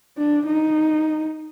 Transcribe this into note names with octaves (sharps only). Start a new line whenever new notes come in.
D4
D#4